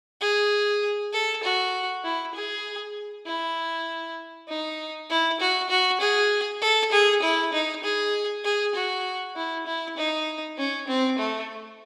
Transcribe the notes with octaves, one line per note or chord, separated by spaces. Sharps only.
G#4
A4
F#4
E4
G#4
E4
D#4
E4
F#4
F#4
G#4
A4
G#4
E4
D#4
G#4
G#4
F#4
E4
E4
D#4
C#4
C4
A3